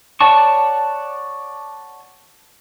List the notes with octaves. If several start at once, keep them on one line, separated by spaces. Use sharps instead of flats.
C#5 D5 F#5 A5 C#6